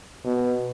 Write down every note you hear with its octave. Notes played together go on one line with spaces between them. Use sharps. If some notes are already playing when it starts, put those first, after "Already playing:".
B2